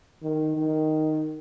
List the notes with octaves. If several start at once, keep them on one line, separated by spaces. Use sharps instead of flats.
D#3
D#3